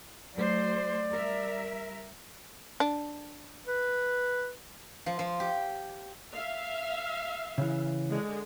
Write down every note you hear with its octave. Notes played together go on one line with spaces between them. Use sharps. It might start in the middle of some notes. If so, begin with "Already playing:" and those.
F#3 A3 C5 D5
G3 A#4 E5
D4
B4
F3
F3
G4
E5 F5
C#3 E3
D3 G#3